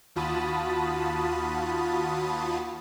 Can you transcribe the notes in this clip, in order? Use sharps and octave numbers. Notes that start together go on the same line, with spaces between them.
D#2 F4 F#4 A5 B5 D#6